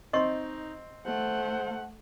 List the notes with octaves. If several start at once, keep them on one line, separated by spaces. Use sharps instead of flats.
C4 D#4 D#5 C6 C#6
A3 C5 F#5